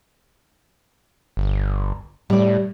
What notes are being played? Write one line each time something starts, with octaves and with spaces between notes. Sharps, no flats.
G1
A2 G3 D5